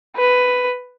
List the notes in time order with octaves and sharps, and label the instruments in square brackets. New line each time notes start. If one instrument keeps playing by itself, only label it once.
[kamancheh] B4